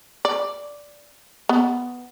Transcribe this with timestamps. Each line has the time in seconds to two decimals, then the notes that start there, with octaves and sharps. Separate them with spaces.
0.25 D5
1.49 B3